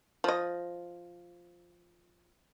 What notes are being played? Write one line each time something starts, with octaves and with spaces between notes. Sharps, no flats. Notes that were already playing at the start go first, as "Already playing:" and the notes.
F3 D#5